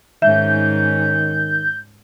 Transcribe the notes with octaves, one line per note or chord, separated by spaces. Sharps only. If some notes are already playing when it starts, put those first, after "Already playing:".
G#2 D#3 C#4 E5 G6